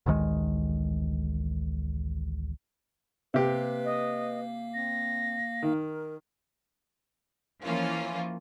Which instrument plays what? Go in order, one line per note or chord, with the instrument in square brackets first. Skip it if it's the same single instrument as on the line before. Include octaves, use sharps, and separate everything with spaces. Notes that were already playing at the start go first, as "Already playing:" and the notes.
[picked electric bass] A1 D2 D#3 G#3
[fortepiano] C3 G4 [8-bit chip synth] A#3 F5 [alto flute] B4
[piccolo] D#5
[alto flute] C4 [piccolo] A#6
[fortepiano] D#3 [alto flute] A#4
[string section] E3 F3 A#3 C#4 F4